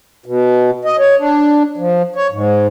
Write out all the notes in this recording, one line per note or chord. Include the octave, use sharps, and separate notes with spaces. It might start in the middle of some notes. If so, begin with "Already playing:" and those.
B2
D#5
C#5
D4
F3
C#5
G#2